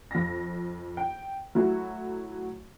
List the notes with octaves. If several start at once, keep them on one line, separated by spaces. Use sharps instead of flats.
F2 A#6
G5
F#3 A3 E4 F#4